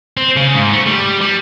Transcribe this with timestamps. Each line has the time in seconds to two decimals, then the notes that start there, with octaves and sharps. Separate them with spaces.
0.17 C4
0.37 C#3
0.55 G#2
0.73 A3
0.87 G3
1.21 G3